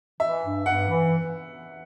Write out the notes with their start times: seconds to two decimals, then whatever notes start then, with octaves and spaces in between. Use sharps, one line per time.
0.20 E3 E5
0.43 G2
0.66 G2 F#5
0.88 E3